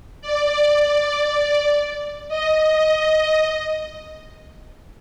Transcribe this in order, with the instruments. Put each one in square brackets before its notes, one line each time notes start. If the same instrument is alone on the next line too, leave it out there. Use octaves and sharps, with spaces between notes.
[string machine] D5
D#5